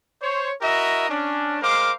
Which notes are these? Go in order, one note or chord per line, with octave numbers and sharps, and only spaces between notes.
C5 C#5
E4 F#4 A#4 D#5 E5
C#4 D4
G#3 A#4 C5 F5 D6